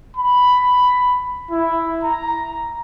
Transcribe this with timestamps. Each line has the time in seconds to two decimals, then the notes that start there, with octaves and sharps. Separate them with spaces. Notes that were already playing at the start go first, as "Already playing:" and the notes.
0.17 B5
1.51 E4
2.03 A#5